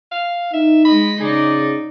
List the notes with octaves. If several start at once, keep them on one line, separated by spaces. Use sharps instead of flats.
F5
D#4 E5
G#3 D#5 B5
C#3 D#4 G#4 D5